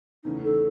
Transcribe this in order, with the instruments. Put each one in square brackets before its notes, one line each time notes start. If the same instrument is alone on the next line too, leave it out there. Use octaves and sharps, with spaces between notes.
[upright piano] E2 C#3 E3 A3 C#4 [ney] D#4
[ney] A4